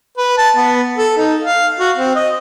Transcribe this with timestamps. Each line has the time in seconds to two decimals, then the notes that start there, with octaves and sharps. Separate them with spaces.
0.18 B4
0.38 A5
0.57 B3
0.98 A4
1.17 D#4
1.44 F5
1.79 F#4
1.97 C4
2.16 D#5